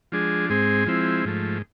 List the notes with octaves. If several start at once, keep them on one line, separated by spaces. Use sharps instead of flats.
F3 G#3 D4 G#4
G#2 G#3 C4 G#4
F3 G#3 C4 E4
G#2 F3 A3